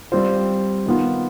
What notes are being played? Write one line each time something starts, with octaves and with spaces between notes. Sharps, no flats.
G3 C4 F4 C5
D#3 B3 F4